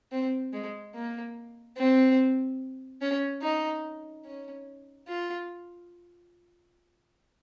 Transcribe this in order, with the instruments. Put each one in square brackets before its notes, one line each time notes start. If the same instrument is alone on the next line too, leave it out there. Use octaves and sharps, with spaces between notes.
[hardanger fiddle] C4
G#3
A#3
C4
C#4
D#4
C#4
F4